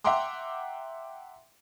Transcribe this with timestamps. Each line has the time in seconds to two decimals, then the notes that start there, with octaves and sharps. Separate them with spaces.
0.04 E5 F#5 G5 A#5 C6 D6